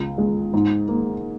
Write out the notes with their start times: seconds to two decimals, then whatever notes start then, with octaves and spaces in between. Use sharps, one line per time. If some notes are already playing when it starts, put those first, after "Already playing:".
Already playing: C#2
0.18 G#3
0.53 G#2
0.88 A#3